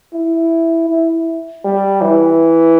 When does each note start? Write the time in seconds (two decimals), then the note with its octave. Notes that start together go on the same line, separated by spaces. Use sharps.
0.13 E4
0.89 E4
1.65 G3
2.01 E3